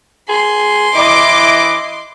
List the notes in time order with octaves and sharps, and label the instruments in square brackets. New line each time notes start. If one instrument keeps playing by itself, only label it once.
[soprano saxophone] G#4 [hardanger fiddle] C6
[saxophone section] E3 D#5 [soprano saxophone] E4 [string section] D6